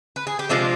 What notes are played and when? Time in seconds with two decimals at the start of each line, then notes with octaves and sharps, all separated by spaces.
0.16 B4
0.27 G#4
0.39 G4
0.49 C3 F3 G#3 D4 F4